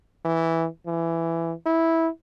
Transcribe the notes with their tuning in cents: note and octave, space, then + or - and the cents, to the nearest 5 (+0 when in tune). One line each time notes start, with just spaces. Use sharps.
E3 -5
E3 +15
E4 -10